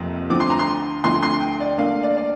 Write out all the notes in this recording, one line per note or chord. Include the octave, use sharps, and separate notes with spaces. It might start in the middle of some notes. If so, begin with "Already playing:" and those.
Already playing: F1 F2 C3 A#3
D2 D3 F3 C4 D6
C6
A#5
C6
D2 D3 F3 C4 C6
C6
G5
D5
D2 D3 A#3 D4 F5
D5
D5